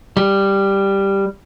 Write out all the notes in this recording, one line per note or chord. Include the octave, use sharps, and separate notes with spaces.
G3